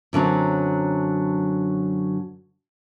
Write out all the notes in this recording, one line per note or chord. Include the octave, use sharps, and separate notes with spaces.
F#2 D3 F#3 C4